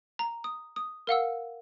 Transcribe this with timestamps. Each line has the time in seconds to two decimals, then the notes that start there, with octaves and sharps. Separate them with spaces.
0.19 A#5
0.44 D#6
0.76 D#6
1.07 A#4 F5 F#5 E6